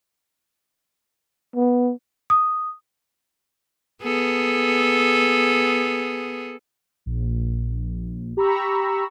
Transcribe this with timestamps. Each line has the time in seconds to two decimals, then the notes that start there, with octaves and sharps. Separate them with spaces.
1.56 B3
2.30 D#6
4.03 B3 G#4 A4
7.06 A#1
8.37 G4 A#5 B5 C#6 E6